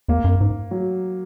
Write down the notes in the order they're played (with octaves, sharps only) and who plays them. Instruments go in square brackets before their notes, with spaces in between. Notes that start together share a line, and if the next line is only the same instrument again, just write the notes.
[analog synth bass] E2 [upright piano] A#3
[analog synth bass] F#2
G#2
[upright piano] F#3